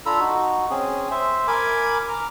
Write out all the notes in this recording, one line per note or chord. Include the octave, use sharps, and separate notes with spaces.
D4 F4 A4 A#5 B5 E6
D#4 F#4
C4 C#4 G#4
C5 E5
A#4 G#5 B5 D6
A#5 D6 F6